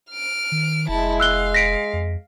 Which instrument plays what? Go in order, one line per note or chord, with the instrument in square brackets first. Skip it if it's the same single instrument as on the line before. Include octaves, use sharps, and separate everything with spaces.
[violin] F6 D7
[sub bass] D#3
[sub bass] F1 [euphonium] G#3 [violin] E4 A5
[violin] F5 [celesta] E6 F#6 G7
[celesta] A#6 B6 D7
[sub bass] F2